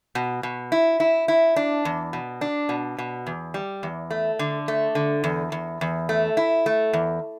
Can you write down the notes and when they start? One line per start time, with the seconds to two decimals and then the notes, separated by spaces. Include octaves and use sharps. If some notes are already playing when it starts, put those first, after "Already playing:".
0.15 B2
0.43 B2
0.72 E4
1.00 E4
1.28 E4
1.56 D4
1.85 E2
2.13 B2
2.41 D4
2.69 B2
2.98 B2
3.27 E2
3.54 G3
3.83 E2
4.11 A3
4.39 D3
4.68 A3
4.95 D3
5.24 E2
5.52 E2
5.81 E2
6.09 A3
6.37 E4
6.66 A3
6.93 E2